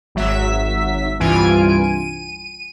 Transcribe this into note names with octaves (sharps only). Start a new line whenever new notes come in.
G#1 F#3 E5 B6
C2 G2 E3 F4 G#5 D7
D#7